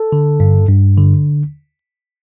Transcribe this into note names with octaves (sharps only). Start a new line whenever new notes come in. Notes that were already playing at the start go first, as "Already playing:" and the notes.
Already playing: A4
D3
G2
G2
D3